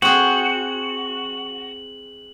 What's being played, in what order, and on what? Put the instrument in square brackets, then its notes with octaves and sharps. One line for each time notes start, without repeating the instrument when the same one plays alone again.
[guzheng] C4 G#4 [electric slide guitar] F#4 [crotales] F#7